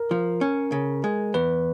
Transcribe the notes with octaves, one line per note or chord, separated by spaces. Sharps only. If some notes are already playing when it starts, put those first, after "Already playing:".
Already playing: A#4
F3
C#4
C#3
G#3
E2 B4